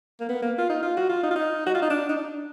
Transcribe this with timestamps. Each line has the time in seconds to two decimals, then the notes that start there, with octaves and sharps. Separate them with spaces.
0.20 A#3
0.29 B3
0.42 A#3
0.58 F4
0.69 D#4
0.83 F4
0.97 F#4
1.09 F4
1.23 D#4
1.31 F4
1.36 D#4
1.66 F#4
1.74 F4
1.82 D#4
1.90 D4
2.09 D#4
2.16 D4